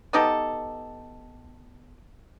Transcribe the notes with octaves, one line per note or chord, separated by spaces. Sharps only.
B3 D#4 G4 A4